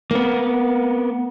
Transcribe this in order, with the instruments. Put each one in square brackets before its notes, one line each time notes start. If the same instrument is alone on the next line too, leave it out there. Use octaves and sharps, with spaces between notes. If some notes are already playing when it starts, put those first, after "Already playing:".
[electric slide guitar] A#3 B3